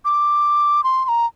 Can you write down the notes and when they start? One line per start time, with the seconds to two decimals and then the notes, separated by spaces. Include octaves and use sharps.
0.05 D6
0.84 C6
1.05 C6
1.09 A#5